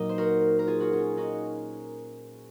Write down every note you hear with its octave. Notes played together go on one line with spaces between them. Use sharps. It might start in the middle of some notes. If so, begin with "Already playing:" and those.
Already playing: A#2 F#3 A#3 D#4
C5
F#4 A#4
A#4
F4 G#4
F#4
C#4 F4
D#4 F#4